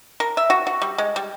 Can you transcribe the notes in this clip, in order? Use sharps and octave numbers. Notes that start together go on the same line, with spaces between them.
A#4
E5
F#4
F#4
G3
G#3
G3